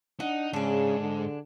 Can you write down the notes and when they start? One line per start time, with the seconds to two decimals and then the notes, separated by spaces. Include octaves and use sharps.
0.20 D4 D#4 F#5
0.53 G#2 C#3 D4 G#4
1.00 D3